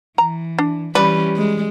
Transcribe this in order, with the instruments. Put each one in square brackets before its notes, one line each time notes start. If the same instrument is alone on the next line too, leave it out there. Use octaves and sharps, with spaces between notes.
[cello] E3 [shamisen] A#5
[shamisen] D4
[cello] E3 [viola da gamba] G3 C#4 [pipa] B4 [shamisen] D5
[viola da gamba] G#3